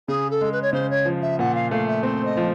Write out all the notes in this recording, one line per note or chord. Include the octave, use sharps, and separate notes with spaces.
C#3 G#4
A4
G#3
B4
C#5
C#3 C5
C#5
F3
E5
A#2 F#5
F5
A3 F5
E5
C4 C5
D#5
F3